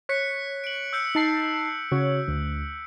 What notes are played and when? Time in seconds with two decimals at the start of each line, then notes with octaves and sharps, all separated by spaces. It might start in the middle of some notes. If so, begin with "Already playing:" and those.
0.09 C#5 F#6 B6 C#7
0.64 D7 F#7
0.93 E6 G6 C#7
1.15 D#4 A5 C7
1.92 C#3 F#4 C#5
2.28 D2